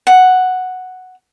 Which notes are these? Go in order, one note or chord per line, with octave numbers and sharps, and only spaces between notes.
F#5